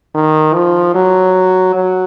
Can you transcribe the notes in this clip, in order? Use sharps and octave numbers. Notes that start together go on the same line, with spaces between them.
D#3
F3
F#3
F#3